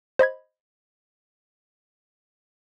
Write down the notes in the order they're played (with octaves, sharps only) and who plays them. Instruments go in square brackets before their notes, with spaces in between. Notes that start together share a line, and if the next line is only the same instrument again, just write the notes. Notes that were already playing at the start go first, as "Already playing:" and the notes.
[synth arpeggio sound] C5 D#5 B5 G#6